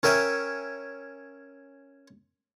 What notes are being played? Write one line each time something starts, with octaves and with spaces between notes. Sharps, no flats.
C#4 A#4 E5 G5 G#5